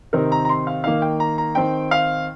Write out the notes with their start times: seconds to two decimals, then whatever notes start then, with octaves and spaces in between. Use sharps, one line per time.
0.13 C3 D#3 C4 D#4 A#4
0.32 A#5
0.45 A#5
0.49 C6
0.67 F5
0.84 D#3 A#3 D#4 F5
1.02 G5
1.20 A#5
1.38 A#5
1.55 D#3 C4 D#4 G5
1.91 F5